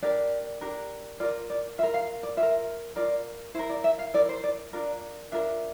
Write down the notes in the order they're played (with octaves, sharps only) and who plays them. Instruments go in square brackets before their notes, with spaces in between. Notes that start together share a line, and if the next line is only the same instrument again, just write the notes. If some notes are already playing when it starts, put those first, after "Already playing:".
[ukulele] D4 G4 A#4 D5
D4 G4 A#4
F4 A#4 D5
D5
F4 E5
A#4
F5
D5
F4 E5
A#4
F4 A#4 D5
E4 C5
A#4
D5
E5
F5
E4 A#4 D5
C5
D5
D4 F4 A#4 D5
D4 F4 A#4 E5